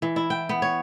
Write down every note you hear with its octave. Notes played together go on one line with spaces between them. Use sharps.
E3
E4
G5
B3
C#5